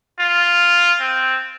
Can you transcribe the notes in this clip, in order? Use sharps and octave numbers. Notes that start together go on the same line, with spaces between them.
F4
C4